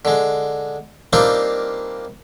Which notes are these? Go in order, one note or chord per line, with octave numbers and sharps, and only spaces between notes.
D3 G#3
G3 A#3 C4 D4 D#4 F4